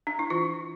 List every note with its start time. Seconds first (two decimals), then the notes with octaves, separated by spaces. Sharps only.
0.07 D4
0.19 E4
0.30 E3 F4